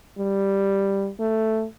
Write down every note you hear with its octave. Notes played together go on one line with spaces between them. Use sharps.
G3
A3